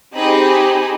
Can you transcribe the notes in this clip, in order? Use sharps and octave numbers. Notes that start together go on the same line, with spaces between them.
C4 D#4 G4 G#4 D#5 B5